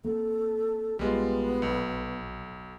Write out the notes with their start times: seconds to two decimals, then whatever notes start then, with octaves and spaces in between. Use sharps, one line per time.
0.04 A#3 C4 A4
0.99 A#1 G3 G#3 B3 F4
1.62 B1